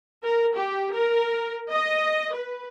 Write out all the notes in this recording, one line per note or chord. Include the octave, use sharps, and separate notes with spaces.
A#4
G4
A#4
D#5
B4